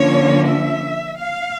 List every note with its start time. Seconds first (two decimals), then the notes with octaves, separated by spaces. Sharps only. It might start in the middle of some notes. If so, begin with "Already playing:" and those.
Already playing: D3 F3 A#3 C#4 C#5
0.47 E5
1.19 F5